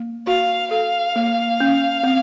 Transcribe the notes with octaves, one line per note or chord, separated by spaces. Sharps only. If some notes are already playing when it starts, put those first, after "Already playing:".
Already playing: A#3
F#4 F5
A4 F5
A#3
C#4
C4